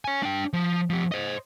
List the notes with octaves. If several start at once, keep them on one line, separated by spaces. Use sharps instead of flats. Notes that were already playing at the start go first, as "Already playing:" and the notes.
C#5 G#5
D4 G5
F3
F3 G4
C5 D#5